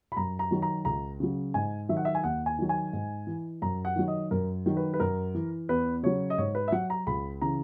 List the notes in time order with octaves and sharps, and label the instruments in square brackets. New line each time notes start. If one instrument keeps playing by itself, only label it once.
[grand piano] B5
F#2 A#5
A#5
D#3 F#3
A#5
C#2 A#5
C#3 F#3
G#2 G#5
D#3 F#3 E5
F#5
E5
G#5
D#2 F#5
G#5
D#3 F#3
G#5
G#2
E3
F#2 A#5
F#5
D#3 F#3
D#5
F#2 A#4
D#3 F#3
B4
B4
F#2 A#4
E3
E2 B4
C#3 F#3 C#5
D#5
G#2 C#5
B4
E5
F#3 F#5
A#5
C#2 B5
C#3 E3 A#5